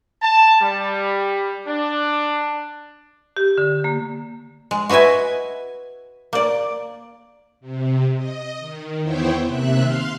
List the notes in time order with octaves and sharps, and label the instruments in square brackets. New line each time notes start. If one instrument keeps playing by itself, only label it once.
[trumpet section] A5
G3
D4
[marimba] G4
D3
A#3
[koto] G#3
F#4 B4 D#5 E5 G#5
A#3 D5
[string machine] C3
D#5
D#3
E2 B3 E4 C5 C#5 G5
D#2 C3 E5 F#6
F5 C6 F6